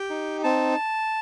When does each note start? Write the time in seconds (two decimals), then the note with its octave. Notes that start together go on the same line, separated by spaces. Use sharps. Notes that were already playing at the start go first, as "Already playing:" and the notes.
Already playing: G4 G5
0.10 D#4
0.44 C4 A5